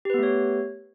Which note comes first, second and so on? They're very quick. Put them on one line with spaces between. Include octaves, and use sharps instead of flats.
G4 B4 B3 A3 C#5